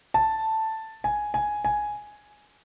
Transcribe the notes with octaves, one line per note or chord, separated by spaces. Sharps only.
A5
G#5
G#5
G#5